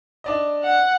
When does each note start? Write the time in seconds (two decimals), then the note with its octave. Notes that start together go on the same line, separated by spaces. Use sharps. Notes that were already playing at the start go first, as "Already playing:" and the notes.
0.24 D4 D5 D#5
0.64 F#5